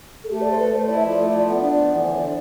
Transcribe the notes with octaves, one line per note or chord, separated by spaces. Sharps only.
A4
A3 G4
D5
A4
C5
A3 B4
A3 C5
E4 D5
E5
F3 D5
A3
F3
B3 D5
D4
B3
E3
D3 C5
D3 D5